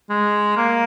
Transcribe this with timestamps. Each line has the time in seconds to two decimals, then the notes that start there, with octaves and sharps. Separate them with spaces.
0.10 G#3
0.57 A#3